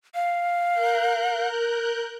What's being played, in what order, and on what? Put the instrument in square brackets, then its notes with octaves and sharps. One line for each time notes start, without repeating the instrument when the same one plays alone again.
[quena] F5
[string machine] A#4 F#6 G6